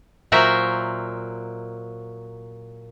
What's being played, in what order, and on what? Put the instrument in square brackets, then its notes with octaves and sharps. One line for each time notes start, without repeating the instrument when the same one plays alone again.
[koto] A#2 F#3 A#4 C5 E5